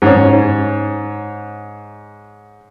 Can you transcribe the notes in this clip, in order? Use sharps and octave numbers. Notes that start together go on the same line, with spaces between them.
G#2 C#4